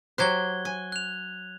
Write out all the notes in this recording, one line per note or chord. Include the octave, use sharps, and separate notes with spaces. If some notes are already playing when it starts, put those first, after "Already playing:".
F#3 G4 C5 F#6 G#6 G7
G#5
F#6 F7